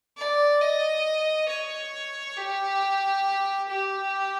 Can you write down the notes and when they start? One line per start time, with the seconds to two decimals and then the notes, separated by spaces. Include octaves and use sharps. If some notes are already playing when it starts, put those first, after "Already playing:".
0.17 D5
0.61 D#5
1.49 C#5
2.37 G4
3.69 G4